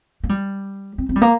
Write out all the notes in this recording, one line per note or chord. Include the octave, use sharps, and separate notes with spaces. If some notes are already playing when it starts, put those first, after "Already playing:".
A#3
G3
C4
C4
G3
A#3